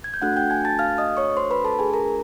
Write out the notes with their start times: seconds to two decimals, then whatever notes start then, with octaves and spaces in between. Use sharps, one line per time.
0.04 G#6
0.14 G6
0.22 A3 D4 F#4 A4 F#5 F#6
0.36 G5 G6
0.50 G#5 G#6
0.65 A5 A6
0.79 F5 F6
0.98 D#5 D#6
1.17 C#5 C#6
1.37 C5 C6
1.51 B4 B5
1.64 A4 A5
1.79 G#4 G#5
1.93 A#4 A#5